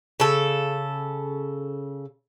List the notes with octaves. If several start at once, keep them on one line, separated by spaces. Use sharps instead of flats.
C#3 A4